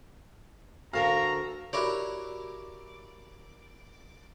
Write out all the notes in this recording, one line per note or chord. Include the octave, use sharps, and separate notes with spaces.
D2 F#4 A4 A#4 F5 A#5
E4 F#4 G4 A#4 C#5 D5